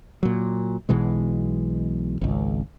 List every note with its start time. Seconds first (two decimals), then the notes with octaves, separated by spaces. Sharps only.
0.23 A#2 F#3
0.89 B1 B2 E3 G#3
2.21 G#1 C#2